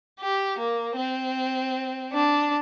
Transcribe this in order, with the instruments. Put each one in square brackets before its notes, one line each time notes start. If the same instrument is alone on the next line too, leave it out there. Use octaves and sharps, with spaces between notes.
[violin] G4
A#3
C4
D4